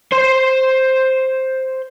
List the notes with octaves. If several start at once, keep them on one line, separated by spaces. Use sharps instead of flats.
C5 C6